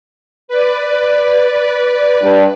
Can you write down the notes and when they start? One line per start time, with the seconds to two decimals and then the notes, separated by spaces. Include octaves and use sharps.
0.48 B4 D5
2.21 G2